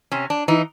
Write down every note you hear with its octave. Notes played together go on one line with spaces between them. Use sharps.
C3 C#4
D4
E3 D#4